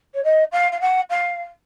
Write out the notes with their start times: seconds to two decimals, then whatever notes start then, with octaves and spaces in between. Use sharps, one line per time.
0.14 C#5
0.24 D#5
0.52 F5
0.72 F5
0.81 F#5
1.10 F5